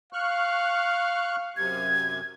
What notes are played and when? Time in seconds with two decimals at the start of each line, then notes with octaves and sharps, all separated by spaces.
0.13 F5 C#6 F6 F#6
1.57 F#2 C3 G#6